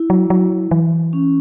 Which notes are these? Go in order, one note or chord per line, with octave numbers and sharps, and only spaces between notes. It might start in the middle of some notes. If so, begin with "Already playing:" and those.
Already playing: E4
F#3
F#3
E3
C#4